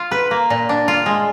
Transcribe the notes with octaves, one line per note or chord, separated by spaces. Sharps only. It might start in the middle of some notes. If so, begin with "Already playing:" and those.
Already playing: F4
B4
A#3
A#2
D4
F4
G#3